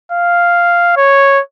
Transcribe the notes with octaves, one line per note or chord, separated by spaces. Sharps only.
F5
C#5